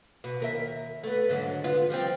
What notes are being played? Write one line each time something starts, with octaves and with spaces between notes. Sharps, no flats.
B2
D#2 A#4 E5
A3 B3
G#2 D3 F#3
B3 F4
F3 G3 C4